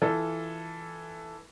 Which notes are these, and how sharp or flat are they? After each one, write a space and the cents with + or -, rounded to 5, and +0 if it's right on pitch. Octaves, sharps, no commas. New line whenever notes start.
E3 +0 F4 +10 A4 +0